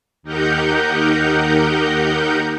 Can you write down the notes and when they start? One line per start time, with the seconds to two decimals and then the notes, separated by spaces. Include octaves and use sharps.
0.23 D#2 D#4 G4 A#4 F#5 G6